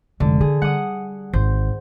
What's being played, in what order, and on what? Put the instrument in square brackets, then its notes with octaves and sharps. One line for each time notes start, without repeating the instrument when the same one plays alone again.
[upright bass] F1 G#3 [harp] D3
[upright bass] D3 [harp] G#4
[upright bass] G3 [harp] F#5 D#6
[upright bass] G#1 [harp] C5